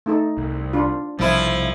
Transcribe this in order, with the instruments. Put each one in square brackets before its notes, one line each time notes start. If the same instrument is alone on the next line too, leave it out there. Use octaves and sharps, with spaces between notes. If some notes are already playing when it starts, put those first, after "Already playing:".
[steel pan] A3 D#4 A4
[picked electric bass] C2
[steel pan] D4 F4
[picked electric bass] B1 C3 G3 [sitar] F3 E4